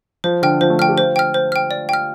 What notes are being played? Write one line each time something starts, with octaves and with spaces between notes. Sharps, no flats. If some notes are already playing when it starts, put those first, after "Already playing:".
F3 C5
D3 G5 F6
F3 C5
A3
D4 G5 F6
G4
F4 C5
G5 F6
C5
G5 F6
D5
G5 F6